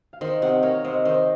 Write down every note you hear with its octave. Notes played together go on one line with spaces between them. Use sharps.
F5
D#3 C5 D#5
C3 D#5 F#5
A#3 C#5 F5
C3 C5 D#5
D#3 C5 D#5